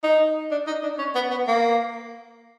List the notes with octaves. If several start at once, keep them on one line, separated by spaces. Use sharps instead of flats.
D#4
D4
D#4
D4
C#4
B3
B3
A#3